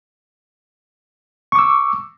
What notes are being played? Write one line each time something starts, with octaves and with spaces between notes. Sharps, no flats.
C#6 D6 E6